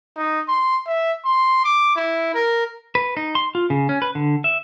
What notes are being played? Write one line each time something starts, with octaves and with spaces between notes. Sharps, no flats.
D#4
C6
E5
C6
D6
E4
A#4
B4
D#4
C6
F4
C#3
C#4
B4
D3
E5